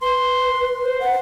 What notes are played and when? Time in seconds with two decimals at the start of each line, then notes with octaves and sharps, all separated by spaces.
0.02 B4 C6
0.84 C5
1.00 F#5